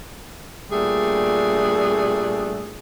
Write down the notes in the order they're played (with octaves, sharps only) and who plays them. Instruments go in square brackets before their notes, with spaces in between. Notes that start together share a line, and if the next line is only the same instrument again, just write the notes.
[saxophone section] A#2 G3 A3 D4 G#4